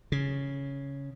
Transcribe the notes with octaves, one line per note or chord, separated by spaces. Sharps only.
C#3